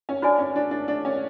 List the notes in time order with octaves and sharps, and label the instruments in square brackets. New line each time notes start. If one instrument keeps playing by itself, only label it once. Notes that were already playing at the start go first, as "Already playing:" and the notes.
[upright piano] C#4
[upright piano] D4 [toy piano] F#4 B4 D5 G#5
[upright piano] C#4
D4
D4
D4
C#4